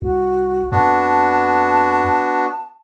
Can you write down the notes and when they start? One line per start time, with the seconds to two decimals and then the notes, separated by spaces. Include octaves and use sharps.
0.02 C2 F#4
0.72 F2 B3 D4 F#4 A5